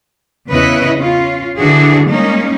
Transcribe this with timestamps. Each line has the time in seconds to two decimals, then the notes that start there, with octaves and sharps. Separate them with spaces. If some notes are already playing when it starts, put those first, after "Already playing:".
0.49 E2 C#3 E4 B4 C#5 D#5
0.97 C#4 F4
1.58 D3 E3 D4 F#4 G#4
2.10 G3 G#3 A#3 C#4 D#4